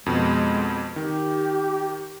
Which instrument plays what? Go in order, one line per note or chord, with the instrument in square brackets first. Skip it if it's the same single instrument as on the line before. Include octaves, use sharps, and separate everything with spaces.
[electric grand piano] F2 B2 [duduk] G#3
[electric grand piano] D#3 [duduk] G4